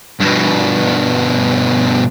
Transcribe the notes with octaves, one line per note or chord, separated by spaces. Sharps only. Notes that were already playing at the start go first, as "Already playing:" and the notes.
G2 B2